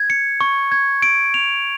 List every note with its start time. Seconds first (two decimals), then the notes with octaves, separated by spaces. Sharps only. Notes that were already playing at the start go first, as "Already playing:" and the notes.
Already playing: G#6
0.10 C#7
0.41 C#6
0.72 G#6
1.02 D7
1.34 F7